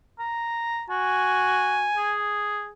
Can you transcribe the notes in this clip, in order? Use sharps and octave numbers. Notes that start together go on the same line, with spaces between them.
A#5
F#4 G#5
G#4